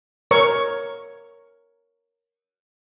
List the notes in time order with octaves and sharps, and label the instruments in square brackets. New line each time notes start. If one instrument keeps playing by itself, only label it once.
[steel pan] A#4 C#5 C#6